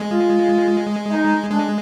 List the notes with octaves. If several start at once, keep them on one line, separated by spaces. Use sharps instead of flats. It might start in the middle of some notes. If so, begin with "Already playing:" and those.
Already playing: G#3
F4
D#4
G#3 D4